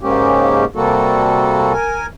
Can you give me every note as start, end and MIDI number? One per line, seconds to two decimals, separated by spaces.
0.01 0.65 44
0.01 0.65 49
0.01 0.65 56
0.01 0.65 58
0.01 0.65 61
0.01 0.65 67
0.75 1.73 48
0.75 1.73 55
0.75 1.73 58
0.75 1.73 66
0.75 1.73 69
1.73 2.06 70
1.73 2.06 80